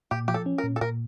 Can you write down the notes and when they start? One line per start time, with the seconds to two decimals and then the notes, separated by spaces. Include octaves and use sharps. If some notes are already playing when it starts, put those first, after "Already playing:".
0.11 A#2 G4
0.28 F3 G4
0.34 A4
0.46 C#4
0.58 A#4
0.64 A#2
0.76 A4
0.81 A#2 A#4